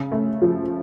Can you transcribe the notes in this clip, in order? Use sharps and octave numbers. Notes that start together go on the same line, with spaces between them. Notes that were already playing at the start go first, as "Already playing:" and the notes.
Already playing: C#3
A3
F3